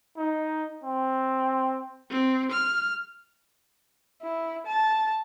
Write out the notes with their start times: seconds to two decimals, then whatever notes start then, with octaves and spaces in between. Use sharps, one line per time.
0.17 D#4
0.84 C4
2.11 C4
2.52 F6
4.22 E4
4.66 A5